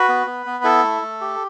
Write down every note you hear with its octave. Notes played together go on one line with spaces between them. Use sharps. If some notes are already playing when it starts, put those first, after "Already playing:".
Already playing: F#4 B4
B3
B3
B3
E4 A4
A3
A3
G4